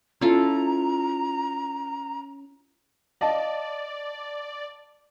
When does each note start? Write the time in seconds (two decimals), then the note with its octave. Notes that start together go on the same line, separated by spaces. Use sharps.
0.21 C#4 E4 F4 A4 A#5
3.21 D5 D#5 F5 A5